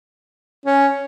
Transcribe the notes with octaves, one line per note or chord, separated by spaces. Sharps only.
C#4